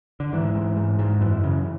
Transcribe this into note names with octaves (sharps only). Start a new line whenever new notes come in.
D3
G#2 E3
G#2
G#2
G#2
F#2 E3
C#3